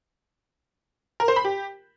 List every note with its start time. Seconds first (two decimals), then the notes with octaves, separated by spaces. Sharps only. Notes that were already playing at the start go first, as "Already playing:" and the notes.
1.20 A#4
1.28 C5
1.36 B5
1.45 G4